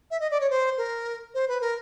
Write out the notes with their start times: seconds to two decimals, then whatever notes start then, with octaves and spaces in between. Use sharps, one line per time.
0.11 E5
0.20 D#5
0.31 D5
0.40 C#5
0.50 C5
0.78 A#4
1.34 C5
1.48 B4
1.61 A#4